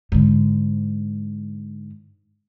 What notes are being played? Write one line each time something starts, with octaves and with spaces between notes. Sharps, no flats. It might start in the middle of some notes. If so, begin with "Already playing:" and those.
G#2 D3